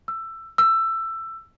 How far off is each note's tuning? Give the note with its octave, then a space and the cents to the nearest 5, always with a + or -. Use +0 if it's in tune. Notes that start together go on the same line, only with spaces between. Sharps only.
E6 +15
E6 +15